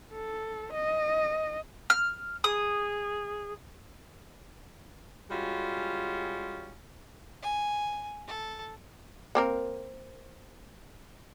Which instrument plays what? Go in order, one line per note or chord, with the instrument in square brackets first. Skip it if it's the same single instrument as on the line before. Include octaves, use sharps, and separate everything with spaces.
[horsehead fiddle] A4
D#5
[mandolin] F6
[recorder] G#4 [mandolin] D#6
[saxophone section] G3 G#3 C#4 F4 F#4
[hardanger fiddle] G#5
A4
[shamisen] A#3 C4 A#4